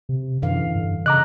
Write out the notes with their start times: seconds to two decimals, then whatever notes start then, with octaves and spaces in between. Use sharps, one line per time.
0.09 C3
0.42 F#2 D3 E3 F5
0.75 G2
1.06 C#3 D#5 A#5 D6 F#6